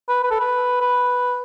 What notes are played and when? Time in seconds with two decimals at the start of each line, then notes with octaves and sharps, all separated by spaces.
0.08 B4
0.23 B4
0.31 A4
0.40 B4
0.81 B4